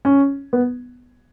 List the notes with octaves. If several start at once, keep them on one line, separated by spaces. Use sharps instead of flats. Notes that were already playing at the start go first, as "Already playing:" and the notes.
C#4
B3